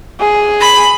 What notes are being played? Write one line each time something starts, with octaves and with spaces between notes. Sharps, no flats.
G#4
B5